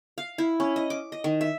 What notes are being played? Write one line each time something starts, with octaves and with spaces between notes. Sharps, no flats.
F5
E4
C#4
D#5
D6
D#5
D#3
E5